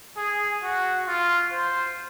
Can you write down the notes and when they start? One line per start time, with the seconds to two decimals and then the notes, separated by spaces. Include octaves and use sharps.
0.17 G#4
0.63 F#4
1.08 F4
1.52 C5